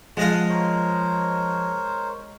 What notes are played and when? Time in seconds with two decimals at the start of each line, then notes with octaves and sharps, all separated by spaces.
0.17 F3 G#3 D#5 F5 F#5 A5
0.49 A#4 C5 C#5